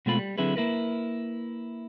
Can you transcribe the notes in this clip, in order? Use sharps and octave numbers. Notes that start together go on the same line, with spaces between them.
B2 G#3 A3 C4 F4 B5
G3
D3 F#3 C4 E4 G#4 B4
A#3 E4 A#4 B4